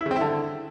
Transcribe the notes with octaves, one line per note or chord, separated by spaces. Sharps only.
E4
C#3
C4
E4
D3